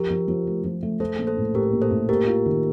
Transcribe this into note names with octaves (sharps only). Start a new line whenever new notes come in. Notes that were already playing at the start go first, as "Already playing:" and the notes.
Already playing: F3 G4 A#4
F3
F3
A3
F3
A3
A3 A4 C5
A#1
A4 C5
A2
A2 G4 A#4
A#1
A4 C5
A2
A#3 G4 A#4
F4
D#3